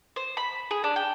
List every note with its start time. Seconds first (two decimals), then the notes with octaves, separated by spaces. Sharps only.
0.16 C5
0.37 B5
0.71 G#4
0.84 D4
0.96 G5